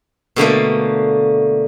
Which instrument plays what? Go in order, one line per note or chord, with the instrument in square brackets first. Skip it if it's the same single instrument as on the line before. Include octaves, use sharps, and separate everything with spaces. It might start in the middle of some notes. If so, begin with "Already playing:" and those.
[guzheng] B2 D3 A3 A#3